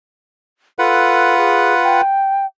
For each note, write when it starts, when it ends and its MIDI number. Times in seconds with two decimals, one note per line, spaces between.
0.79 2.01 65
0.79 1.35 69
0.79 2.01 71
0.79 2.01 78
1.38 1.74 68
1.83 2.46 79